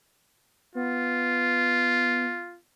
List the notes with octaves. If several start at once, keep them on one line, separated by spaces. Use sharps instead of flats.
B3 F4